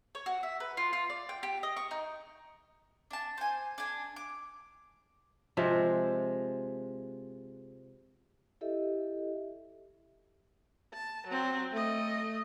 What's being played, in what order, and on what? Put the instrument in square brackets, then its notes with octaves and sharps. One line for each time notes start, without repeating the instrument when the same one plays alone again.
[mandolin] C#5
F#4
E5
B4
F4
F4
D5
G5
G4
D#5
C#6
D#4
D4 A5
C5 G#5
D4 G#5
D6
[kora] C3 F3 G#3 E5
[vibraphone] E4 G4 A4 D#5 E5
[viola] A5
F#3 C4
A3 D#5